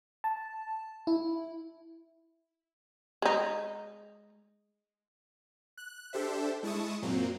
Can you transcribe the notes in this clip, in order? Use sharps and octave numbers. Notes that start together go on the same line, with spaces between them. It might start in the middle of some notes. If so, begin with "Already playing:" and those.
A5
E4
G#3 D#4
F#6
D4 G4 A4 C5 E5
G#3 E4 A5 C#6 D#6
F#2 A#2 F#3 A#3 C4